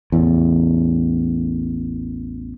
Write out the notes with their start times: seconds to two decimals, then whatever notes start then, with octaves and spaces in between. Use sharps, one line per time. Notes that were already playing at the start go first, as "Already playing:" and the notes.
0.12 A1 E2